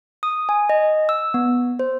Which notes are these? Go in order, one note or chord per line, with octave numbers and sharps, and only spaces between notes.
D#6
G#5
D#5
E6
B3
C5